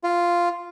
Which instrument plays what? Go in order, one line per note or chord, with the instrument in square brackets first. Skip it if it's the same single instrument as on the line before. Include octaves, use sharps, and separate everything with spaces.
[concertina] F4